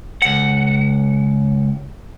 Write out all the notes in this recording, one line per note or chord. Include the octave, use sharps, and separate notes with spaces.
C#2 F#5